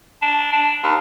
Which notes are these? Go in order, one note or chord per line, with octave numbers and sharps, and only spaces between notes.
D4
D4
D#2